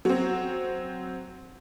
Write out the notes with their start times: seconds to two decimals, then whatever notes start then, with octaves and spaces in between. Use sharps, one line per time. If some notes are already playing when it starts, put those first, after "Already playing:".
0.05 F#3 C4